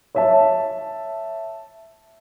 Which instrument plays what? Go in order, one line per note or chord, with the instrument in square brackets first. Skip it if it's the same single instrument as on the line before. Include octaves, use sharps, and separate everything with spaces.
[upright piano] C#5 E5 A5